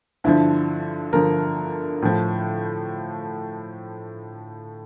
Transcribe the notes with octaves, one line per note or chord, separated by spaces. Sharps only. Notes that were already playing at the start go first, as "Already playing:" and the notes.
G2 D3 F3 E4
G2 D3 F3 A#4
A2 F3